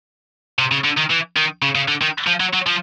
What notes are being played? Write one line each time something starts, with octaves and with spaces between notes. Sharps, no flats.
C3
C#3
D3
D#3
E3
D#3
C#3
C#3
D3
D#3
F3
F#3
F#3
F3